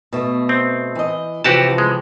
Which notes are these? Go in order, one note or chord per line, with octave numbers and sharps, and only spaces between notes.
B2 A3
C4
E3 D#5
C3 E3 F3 F#4 G4 A5
G#3